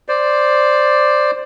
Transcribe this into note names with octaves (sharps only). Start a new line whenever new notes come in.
C5 D5